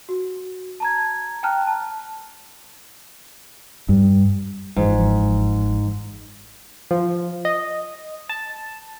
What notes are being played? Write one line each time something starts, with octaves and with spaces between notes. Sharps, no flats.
F#4
A5 A#5 G#6
G5 A5 A#5 F6 F#6
A5
G2
G1 G#2 E3 F3
F3
D#5
A5